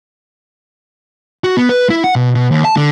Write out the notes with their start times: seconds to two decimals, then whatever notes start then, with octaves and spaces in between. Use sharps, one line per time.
1.44 F#4
1.57 B3
1.69 B4
1.90 E4
2.04 F#5
2.16 B2
2.35 B2
2.51 D#2
2.65 A5
2.76 D3